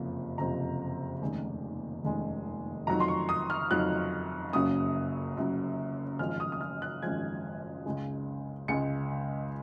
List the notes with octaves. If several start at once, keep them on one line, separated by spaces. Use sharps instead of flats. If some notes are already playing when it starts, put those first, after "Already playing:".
Already playing: F#1 F2 C3 F3
F#1 F2 C3 F3 A#5
F1 D#2 C#3 G#3
F1 D#2 C#3 G#3
F2 D#3 F#3 A#5
C6
C#6
D#6
F6
F2 D#3 F#3 F#6
F#1 F#2 C#3 F#3 D#6
F#1 F#2 C#3 F#3
G#1 F#2 F3 G#3 F6
D#6
D#6
F6
F#6
G#1 F#2 F3 G#3 G#6
C#2 C#3 G#3
C#2 C#3 G#3 C#7